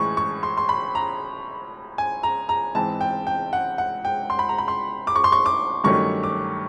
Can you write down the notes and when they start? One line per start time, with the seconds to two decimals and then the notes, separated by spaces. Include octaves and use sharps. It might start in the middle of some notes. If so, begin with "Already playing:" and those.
Already playing: A2 E3 G#3 C#6
0.17 C#6
0.43 C6
0.57 C6
0.69 B5
0.95 A#5
1.98 G#5
2.23 A#5
2.49 A#5
2.75 G#2 E3 G#3 C4 A5
3.01 G5
3.27 G5
3.53 F#5
3.78 F#5
4.05 G5
4.30 C6
4.39 B5
4.49 A#5
4.58 B5
4.68 C6
5.07 D6
5.16 C#6
5.24 C6
5.32 C#6
5.46 D6
5.84 G2 D#3 F#3 A3 C#4 C#6
6.23 D6